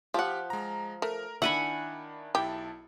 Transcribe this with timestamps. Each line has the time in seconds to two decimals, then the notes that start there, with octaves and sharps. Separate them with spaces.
0.14 F3 G4 F#5
0.50 G#3 A#5
1.02 A3 A#4
1.42 D#3 D4 E4 E5 F#5 G#5 B5
2.35 B1 E4 G4 A5